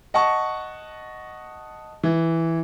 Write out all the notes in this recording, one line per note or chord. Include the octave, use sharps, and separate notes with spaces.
D#5 F#5 A5 C#6
E3